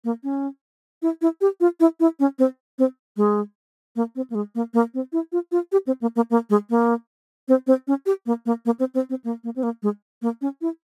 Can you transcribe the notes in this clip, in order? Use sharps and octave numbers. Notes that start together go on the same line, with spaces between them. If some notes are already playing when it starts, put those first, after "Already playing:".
A#3
C#4
E4
E4
G4
F4
E4
E4
C#4
C4
C4
G#3
A#3
C4
A#3
G#3
A#3
A#3
C4
E4
F4
F4
G4
C4
A#3
A#3
A#3
G#3
A#3
C4
C4
C#4
G4
A#3
A#3
A#3
C4
C4
C4
A#3
A#3
C4
A#3
G#3
A#3
C#4
E4